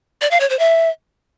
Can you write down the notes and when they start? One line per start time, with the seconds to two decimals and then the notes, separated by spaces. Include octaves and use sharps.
0.22 D5
0.31 F5
0.40 C#5
0.50 C5
0.59 E5